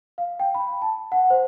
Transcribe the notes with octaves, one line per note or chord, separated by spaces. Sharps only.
F5
G5
B5
A5
F#5
C5